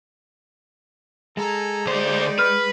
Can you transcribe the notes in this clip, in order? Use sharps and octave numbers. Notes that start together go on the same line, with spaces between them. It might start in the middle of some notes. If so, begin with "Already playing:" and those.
G#3 A4 G#5 A#5
D2 D#4 G4 C5 D5
B4 F6